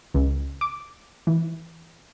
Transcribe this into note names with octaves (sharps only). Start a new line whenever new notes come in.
C#2
D6
E3